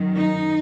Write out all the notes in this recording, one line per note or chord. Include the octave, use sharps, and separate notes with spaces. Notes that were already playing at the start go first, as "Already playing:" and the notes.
Already playing: F#2 D#3 F#3
D#4